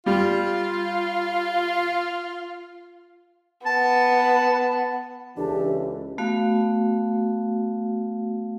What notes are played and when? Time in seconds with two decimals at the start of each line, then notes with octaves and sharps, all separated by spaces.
0.06 G3 F4
3.66 B3 A5
5.37 C#2 E3 D4 G4 A4 A5
6.18 A3 B3 F#4 F5